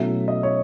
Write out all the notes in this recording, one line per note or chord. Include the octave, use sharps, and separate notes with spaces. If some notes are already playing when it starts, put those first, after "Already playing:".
Already playing: B2 F#3 A3 C#4 E4 E5
D#5
C#5